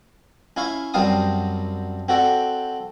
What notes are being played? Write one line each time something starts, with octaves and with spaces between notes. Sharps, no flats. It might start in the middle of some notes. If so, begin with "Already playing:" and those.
C#4 E4 F5 C#6
F#2 G3 C4 F5 A5 D#6
C4 F#4 A4 D5